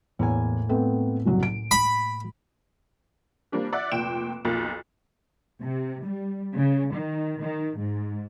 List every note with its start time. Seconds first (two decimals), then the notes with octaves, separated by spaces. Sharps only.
0.19 E2 A2 A#3 G#5
0.69 A3 B3 C4
1.25 F#1 C2 F#3
1.43 D7
1.71 B5
3.52 G3 A#3 C4 D4 G4
3.73 D5 E5 F#5 D6 F#6
3.92 F1 A#2 G5 D7 E7
4.45 B1 F2 A#3 A6
5.62 C3
6.04 G3
6.57 C#3
6.95 D#3
7.41 D#3
7.80 G#2